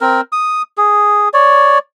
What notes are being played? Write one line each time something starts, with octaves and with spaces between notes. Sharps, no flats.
C4 A#4
D#6
G#4
C#5 D5